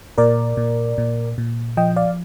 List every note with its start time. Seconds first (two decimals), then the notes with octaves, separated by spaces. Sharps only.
0.18 A#2 A#4 D5
0.57 A#2
0.98 A#2
1.38 A#2
1.77 F3 D#5 G5
1.96 D5 F5